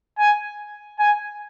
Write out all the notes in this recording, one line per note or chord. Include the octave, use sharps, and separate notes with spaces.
G#5
G#5